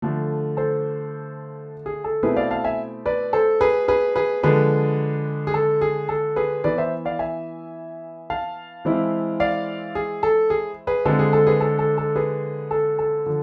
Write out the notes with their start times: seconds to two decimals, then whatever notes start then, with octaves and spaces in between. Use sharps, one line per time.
0.02 D3 F3 A3
0.57 A4 C5
1.86 G#4
2.04 A4
2.23 B2 A3 C4 E4 G#4 B4
2.36 D5 F5
2.51 F5 A5
2.64 E5 G#5
3.06 B4 D5
3.33 A4 C5
3.61 G#4 B4
3.88 G#4 B4
4.16 G#4 B4
4.43 D3 F3 G#3 G#4 B4
5.47 G#4
5.54 A4
5.81 G#4
6.09 A4
6.36 G#4 B4
6.64 E3 B3 E4 B4 D5
6.78 C5 E5
7.05 D5 F5
7.19 E5 G#5
8.30 F5 A5
8.85 E3 G#3 C4 E4
9.40 D5 F5
9.95 G#4
10.23 A4
10.50 G#4
10.87 G#4 B4
11.05 D3 G#3 C4 F4 A4
11.19 G#4
11.33 A4
11.47 G#4 B4
11.61 A4
11.79 A4
11.98 A4
12.16 G#4 B4
12.71 A4
12.99 A4
13.26 D3 F3